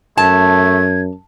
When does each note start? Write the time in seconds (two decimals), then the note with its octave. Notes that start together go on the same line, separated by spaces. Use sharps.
0.18 F#2 A3 A5 G#6